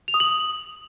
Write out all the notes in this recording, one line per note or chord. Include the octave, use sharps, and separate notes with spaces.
F7
D#6
F#7